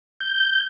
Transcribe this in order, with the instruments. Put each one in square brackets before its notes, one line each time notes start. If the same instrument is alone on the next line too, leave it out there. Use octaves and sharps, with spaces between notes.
[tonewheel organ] G6